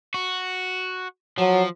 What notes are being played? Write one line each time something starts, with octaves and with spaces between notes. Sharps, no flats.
F#4
F3 F#3